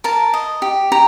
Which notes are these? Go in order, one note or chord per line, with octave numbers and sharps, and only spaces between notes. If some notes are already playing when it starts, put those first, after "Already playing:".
A#4 A5
D#5
G4
G4 A#5